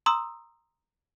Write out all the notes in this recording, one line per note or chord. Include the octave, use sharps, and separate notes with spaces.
A#5 C6 D#6 E6